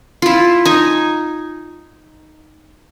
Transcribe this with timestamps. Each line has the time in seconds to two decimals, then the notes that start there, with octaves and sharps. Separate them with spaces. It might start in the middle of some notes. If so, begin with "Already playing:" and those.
0.22 E4 F4
0.65 D#4 G#5